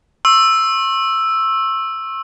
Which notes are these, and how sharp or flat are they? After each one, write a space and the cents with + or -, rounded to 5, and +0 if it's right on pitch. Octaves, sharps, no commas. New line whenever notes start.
C#6 -40 E6 +0